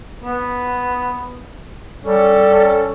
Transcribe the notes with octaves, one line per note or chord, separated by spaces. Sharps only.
B3
G3 C#4 A4
C#4